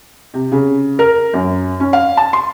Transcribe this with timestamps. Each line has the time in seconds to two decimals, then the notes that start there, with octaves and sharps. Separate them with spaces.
0.34 C3
0.52 C#3
0.99 A#4
1.34 F#2
1.80 C#4
1.93 F5
2.17 A5
2.33 C6